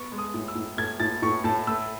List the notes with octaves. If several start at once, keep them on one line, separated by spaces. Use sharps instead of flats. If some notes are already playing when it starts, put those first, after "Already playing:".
Already playing: B3 C#6
G#3
D#6
A2
E6
A2
A2 G#6
A2 A6
A2 C#6
A2 A5
A3 E6